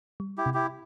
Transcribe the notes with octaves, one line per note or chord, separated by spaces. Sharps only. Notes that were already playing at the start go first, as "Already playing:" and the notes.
G3
E4 G4
C3
E4 G4